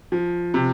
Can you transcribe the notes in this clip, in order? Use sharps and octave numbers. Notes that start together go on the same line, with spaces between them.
F3
C3